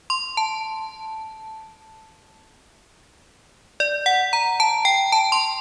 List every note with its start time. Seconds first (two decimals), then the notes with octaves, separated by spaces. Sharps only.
0.10 C6
0.37 A5
3.80 D5
4.06 F#5
4.33 A#5
4.60 A5
4.85 G5
5.12 A5
5.32 C6